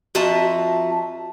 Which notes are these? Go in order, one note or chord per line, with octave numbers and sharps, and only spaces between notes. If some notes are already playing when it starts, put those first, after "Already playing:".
F2 F4 F#4 E5 A5 A#5